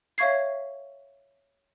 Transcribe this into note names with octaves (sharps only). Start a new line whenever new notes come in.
C#5 E5 F5 C#6 G#6 C7